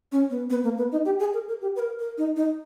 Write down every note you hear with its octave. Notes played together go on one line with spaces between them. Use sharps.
C#4
B3
B3
A#3
B3
D#4
G4
G#4
A#4
A#4
G4
B4
A#4
A#4
D#4
D#4